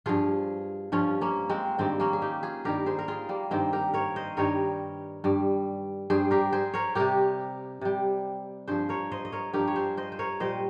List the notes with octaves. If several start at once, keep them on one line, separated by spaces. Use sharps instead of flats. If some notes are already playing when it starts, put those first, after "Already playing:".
G2 F3 F4 G#4
G2 F3 C#4 F4
A#3 C#4
G#3 C4
G2 D#3 G3 G#3 C4
A#3 C#4
G#4
D#4 G4
F4 G#4
G2 D#3 G3 G4 A#4
G#4 C5
A#4
F4 G#4
G3 A#3
G2 D#3 G3 G#3 C4
G4 A#4
A#4 C#5
C5 D#5
G2 D#3 G3 A#4 C#5
G2 G3
G2 G3 G#4 C5
G4 A#4
G#4 C5
A#4 C#5
C3 G3 G4 A#4
C3 G3
G2 F3 G#4 C5
A#4 C#5
C5 D#5
D#5
A#4 C#5
G2 F3 G4 A#4
C#5
G#4 C5
C5 D#5
C5
A#4 C#5
A#2 G3 C5 D#5